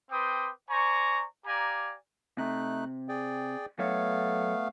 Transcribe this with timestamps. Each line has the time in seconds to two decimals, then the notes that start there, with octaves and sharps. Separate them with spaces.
0.10 C4 B4 G5 C6 D6 D#6
0.70 C5 D5 G#5 A#5 C#6
1.46 G4 D5 F5 G#5 A#5
2.38 C3 A3 D#4 F#6
3.09 G#4 D5 G5
3.79 F#3 A3 B3 A4 C#5 F5